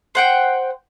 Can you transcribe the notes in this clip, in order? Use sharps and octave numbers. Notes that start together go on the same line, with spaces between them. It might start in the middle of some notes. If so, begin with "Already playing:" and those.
C5 F#5 G5